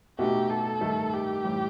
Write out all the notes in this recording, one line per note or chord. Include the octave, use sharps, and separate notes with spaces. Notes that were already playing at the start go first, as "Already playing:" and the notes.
B2 A3 D#4 F#4 G4
A4
G2 D#3 A3
G4
A2 E3 G3